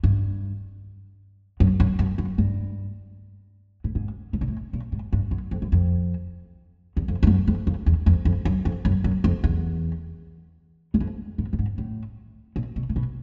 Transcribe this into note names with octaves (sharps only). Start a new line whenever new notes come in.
G2
F#2
F#2
F#2
F#2
G2
A2
G#2
A2
A#2
A2
A#2
G#2
G2
F#2
F2
F#2
F2
E2
F2
F2
F#2
F2
F2
E2
F2
F2
F#2
F2
F#2
F#2
F2
E2
E2
F2
G#2
G2
G#2
A2
A#2
B2
A#2
B2